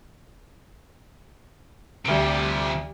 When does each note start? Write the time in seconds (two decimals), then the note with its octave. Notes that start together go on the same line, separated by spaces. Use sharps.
2.05 D2 C3 F3 G3 G4 D7